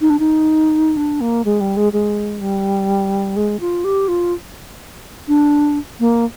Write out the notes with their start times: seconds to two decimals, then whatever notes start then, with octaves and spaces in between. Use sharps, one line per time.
0.01 D#4
0.10 D4
0.19 D#4
0.97 D4
1.21 A#3
1.45 G#3
1.61 G3
1.77 G#3
1.93 G#3
2.40 G3
3.36 G#3
3.60 F4
3.84 G4
4.08 F4
5.28 D4
6.00 A#3